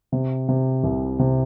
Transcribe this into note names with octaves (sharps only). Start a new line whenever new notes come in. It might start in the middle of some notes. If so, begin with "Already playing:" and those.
C3
C3
C2
C3